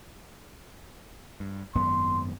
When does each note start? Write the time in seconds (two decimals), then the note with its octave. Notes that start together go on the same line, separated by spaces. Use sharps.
1.40 G2
1.75 G#1 F#2 B3 C6